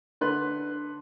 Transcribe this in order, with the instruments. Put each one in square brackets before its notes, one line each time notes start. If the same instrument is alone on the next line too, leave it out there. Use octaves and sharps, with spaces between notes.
[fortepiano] D3 B4 C6 F#6